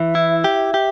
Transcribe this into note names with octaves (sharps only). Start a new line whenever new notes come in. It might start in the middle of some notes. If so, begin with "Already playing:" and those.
Already playing: E3 E5
E4
G4
G4